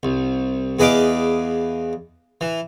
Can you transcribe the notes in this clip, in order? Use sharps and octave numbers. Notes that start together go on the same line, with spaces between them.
C2
E2 G#4 B4 D#5 F5 D6
E3